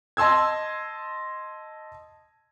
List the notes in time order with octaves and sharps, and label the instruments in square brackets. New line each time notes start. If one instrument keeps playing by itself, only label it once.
[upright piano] D#5 A5 C6 E6 G#6